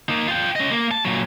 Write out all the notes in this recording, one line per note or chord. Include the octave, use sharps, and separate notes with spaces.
A#3 D#4
F4 G5
C#4 D#5
A#3
A5
A#2 F#3